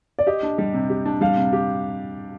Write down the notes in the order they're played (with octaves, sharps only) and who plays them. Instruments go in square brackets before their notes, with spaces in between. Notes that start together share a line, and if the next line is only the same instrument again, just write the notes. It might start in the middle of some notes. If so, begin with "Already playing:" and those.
[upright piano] D5
[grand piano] G4 [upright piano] D#5
[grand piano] D4
G3
C3
G4
D4
[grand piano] G3 [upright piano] F5
[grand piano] C3
G4